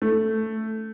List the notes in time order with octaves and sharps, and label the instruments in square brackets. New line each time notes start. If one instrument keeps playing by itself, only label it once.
[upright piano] A3